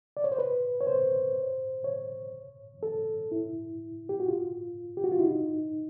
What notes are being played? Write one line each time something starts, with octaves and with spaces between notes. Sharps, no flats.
D5
C#5
C5
B4
C#5
C5
C#5
A4
E4
G4
F#4
F4
G4
F#4
F4
E4
D#4